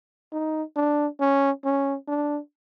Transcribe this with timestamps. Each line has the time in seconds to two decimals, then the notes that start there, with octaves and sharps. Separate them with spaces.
0.32 D#4
0.76 D4
1.20 C#4
1.64 C#4
2.08 D4